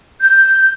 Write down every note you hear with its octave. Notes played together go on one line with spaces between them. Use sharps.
G6